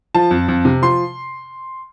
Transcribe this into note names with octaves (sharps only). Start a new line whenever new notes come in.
F3 A5
F2
F2
C3
F3 C6